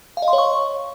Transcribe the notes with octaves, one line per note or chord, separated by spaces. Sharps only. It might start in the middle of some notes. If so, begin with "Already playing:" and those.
F5
D#5
C6
C#5
C#6